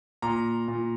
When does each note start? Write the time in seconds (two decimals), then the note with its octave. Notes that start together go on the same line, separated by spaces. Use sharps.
0.22 A#2 A#5
0.68 A#2